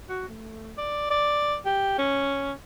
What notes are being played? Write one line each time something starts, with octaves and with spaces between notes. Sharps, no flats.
F#4
A3
D5
D5
G4
C#4